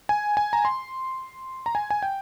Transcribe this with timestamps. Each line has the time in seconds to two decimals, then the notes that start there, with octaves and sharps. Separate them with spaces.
0.09 G#5
0.37 G#5
0.53 A#5
0.65 C6
1.66 A#5
1.75 G#5
1.90 G#5
2.02 G5